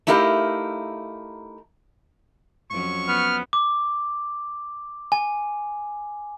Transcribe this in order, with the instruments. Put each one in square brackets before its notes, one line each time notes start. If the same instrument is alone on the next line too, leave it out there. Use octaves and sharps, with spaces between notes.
[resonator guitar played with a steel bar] A3 D#4 E4 G4 A#4 F5
[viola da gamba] F2 F#3 C#4 [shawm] C#6
[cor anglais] B3 [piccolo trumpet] F6
[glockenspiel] D6
G#5